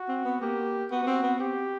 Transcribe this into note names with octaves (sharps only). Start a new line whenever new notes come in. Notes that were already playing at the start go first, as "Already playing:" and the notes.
Already playing: F#4
C4
B3
A#3 G4
B3 F#4
B3
C4
B3
C4 G4